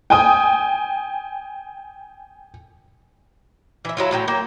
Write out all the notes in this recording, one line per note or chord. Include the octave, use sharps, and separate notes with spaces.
G5 G#5 D#6
E3 E5
F#3 E4 F4
A2 F#3 G4 G5
A#3 G5